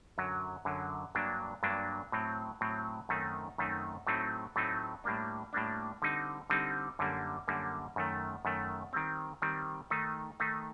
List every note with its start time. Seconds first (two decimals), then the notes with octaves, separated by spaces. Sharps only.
0.18 F#2 D3 F#3
0.65 F#2 D3 F#3
1.15 G2 F#3 A#3 D4
1.63 G2 F#3 A#3 D4
2.12 A2 F#3 C4
2.61 A2 F#3 C4
3.09 F#2 D#3 A3 C4 D#4
3.58 F#2 D#3 A3 C4 D#4
4.07 A2 F#3 A3 C4 D#4
4.56 A2 F#3 A3 C4 D#4
5.04 A2 G3 A#3 D4
5.53 A2 G3 A#3 D4
6.02 D3 G3 C4 D#4
6.50 D3 G3 C4 D#4
6.99 F#2 D3 G3 A#3
7.48 F#2 D3 G3 A#3
7.96 F#2 D#3 A3
8.45 F#2 D#3 A3
8.93 D#3 G3 C4
9.42 D#3 G3 C4
9.90 D#3 A3 D#4
10.40 D#3 A3 D#4